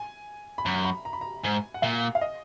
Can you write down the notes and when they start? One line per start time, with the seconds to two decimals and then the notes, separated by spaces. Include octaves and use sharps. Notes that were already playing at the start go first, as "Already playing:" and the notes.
Already playing: G#5
0.58 B5
0.65 F#2 A#5
0.85 B5
1.05 A#5
1.13 B5
1.21 A#5
1.43 G#2 G#5
1.74 F#5
1.82 A#2 F5
2.15 F5
2.21 D#5